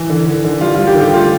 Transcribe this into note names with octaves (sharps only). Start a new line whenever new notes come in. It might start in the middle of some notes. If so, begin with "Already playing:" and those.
Already playing: E3
D3
D3
D3
G3 F4
G3 F4
G4
D3
G4
A3 F4